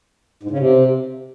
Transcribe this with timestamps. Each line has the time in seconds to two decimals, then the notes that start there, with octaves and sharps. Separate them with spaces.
0.43 G#2
0.51 C#3
0.58 C3